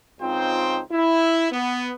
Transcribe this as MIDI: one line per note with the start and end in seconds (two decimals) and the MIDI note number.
0.20 0.80 37
0.20 0.80 60
0.20 0.80 63
0.20 0.80 65
0.20 0.80 72
0.20 0.80 79
0.92 1.48 64
1.51 1.93 59